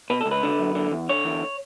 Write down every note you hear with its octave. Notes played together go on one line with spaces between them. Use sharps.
B2 B4
A4
C#2
B4
D3
F#2
D3
E2
D3 C#5
E2